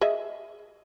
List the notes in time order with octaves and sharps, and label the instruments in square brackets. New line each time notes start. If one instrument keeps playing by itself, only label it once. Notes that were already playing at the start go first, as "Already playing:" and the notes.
[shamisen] G#4 D#5 E5